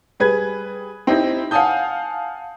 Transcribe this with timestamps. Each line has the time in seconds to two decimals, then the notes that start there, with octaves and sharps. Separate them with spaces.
0.20 G3 G#4 B4 G#6
1.07 C4 D#4 E4 G4 C5
1.51 F5 F#5 G#5 A5 D#6 G6